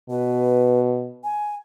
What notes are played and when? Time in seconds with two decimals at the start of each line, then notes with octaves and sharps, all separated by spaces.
0.10 B2 B4
1.24 G#5